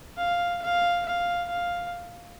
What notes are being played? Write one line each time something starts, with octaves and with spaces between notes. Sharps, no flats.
F5
F5
F5
F5